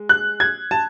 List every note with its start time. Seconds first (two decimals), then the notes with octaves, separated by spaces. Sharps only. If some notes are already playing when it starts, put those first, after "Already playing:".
Already playing: G#3
0.09 F#6
0.40 G#6
0.71 A5